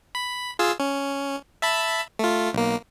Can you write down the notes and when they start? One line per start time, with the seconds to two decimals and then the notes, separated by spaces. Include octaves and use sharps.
0.15 B5
0.59 F4 G#4 E6
0.80 C#4
1.62 E5 A5 B5
2.19 A3 F4
2.53 B1 A#3